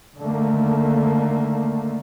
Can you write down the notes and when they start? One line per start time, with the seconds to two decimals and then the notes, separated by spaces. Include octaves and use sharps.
0.18 D3 D#3 A3 A#3